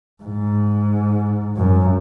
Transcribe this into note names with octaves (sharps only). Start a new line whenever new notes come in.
G#2
F#2